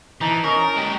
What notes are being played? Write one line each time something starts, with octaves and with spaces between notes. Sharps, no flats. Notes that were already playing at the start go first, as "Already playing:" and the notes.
E3 D#4 A5
C#4 A#4 D#5
G#3 G4